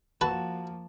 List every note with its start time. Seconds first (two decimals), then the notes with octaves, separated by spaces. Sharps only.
0.21 F3 A#3 F#4 B4 A5